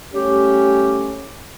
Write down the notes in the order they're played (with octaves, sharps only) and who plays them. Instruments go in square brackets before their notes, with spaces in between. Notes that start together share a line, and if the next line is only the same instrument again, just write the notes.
[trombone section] G3 A3 C#4 [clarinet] G4